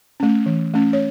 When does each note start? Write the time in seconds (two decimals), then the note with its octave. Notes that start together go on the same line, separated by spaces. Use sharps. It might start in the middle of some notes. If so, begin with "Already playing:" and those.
0.20 A3 C#4
0.46 E3
0.74 A3 C#4
0.93 C#5